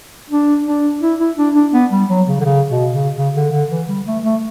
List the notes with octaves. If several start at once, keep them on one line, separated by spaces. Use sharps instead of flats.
D4
D4
E4
E4
D4
D4
B3
G3
F#3
C#3
D3
C#3
B2
C#3
C#3
D3
D3
E3
G3
A3
A3